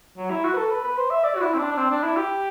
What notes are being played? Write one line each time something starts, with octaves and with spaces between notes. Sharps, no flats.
F#3
E4
F#4
B4
A4
B4
B4
C5
E5
D5
F#4
E4
C4
D4
D4
C4
D4
E4
G4